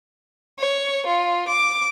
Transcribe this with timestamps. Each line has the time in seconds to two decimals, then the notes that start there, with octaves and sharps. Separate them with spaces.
0.59 C#5
1.06 F4
1.48 D6